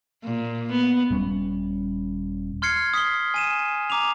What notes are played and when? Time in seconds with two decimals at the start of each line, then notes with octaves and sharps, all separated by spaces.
0.24 A#2
0.72 B3
1.11 D#1 G3 C#4
2.62 C6 F6 G#6 C7 C#7
2.94 D#6 B6 C7 G7
3.34 G#5 D#7 E7
3.90 A#5 D6 D#7 F7